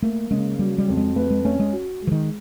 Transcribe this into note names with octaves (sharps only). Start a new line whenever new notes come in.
A3 A#3
C#3 G#3
F#3 G3
G3
F2
G#3
A3 B4
G#3
A3 C#4
G#3
F#4
G#3
E3
D#3